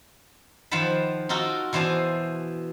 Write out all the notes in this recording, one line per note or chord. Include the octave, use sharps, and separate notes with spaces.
D#3 F3 C5 F#5 A5 B5
D#4 F4 F#4 A4 A#4
B2 E3 C5 D5 G#5 A5